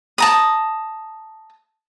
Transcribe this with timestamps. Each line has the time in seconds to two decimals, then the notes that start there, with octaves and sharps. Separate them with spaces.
0.18 A5 A#5 D#6